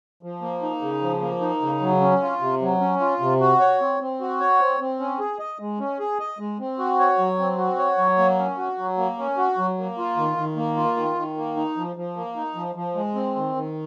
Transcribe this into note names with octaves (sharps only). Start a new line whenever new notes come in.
F3
A#3
D#4
C#3
F3
A#3
D#4
C#3
F#3
C#4
F4
C3
F#3
C#4
F4
C3
F#4
C#5
C4
C4
F#4
C#5
C4
C4
C#4
G#4
D#5
G#3
C#4
G#4
D#5
G#3
C4
F#4
C#5
F#3
C4
F#4
C#5
F#3
A#3
C#4
F#4
F#3
A#3
C#4
F#4
F#3
A#3
F4
D#3
D#3
A#3
F4
D#3
D#3
A#3
D#4
F3
F3
A#3
D#4
F3
F3
G#3
C4
D#3
D#3